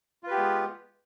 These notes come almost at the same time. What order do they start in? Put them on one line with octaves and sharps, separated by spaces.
F4 B4 G4 B3 G#3